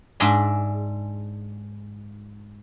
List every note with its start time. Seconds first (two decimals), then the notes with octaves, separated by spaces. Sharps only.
0.20 G#2 D4 G#4 E5 G#5 C6